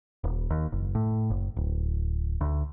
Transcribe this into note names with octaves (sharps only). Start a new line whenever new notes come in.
D#1
D#2
F#1
A2
F#1
D1
D2